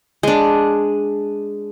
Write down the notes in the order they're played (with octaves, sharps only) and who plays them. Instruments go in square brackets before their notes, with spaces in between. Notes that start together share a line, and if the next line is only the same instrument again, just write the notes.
[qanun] G#3 D4